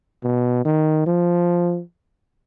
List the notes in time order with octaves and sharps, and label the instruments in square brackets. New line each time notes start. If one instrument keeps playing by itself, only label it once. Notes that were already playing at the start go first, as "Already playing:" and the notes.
[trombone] B2
D#3
F3